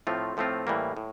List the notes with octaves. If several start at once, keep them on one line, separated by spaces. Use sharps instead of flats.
A2 F3 A3 C4 F4
A2 F3 A3 C4 F4
A2 E3 G3 A#3
A2